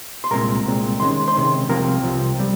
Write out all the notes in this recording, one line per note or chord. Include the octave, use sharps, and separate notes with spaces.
C6
C2 A#2 G#3 C4 A#4 A#5
C2 A#2 G#3 C4
C3 D#3 G#3 C#4 C6
C5 C6
C3 D#3 G#3 C#4
C2 C3 F3 C4 A#4 A#5
C2 C3 F3 C4
G3 C4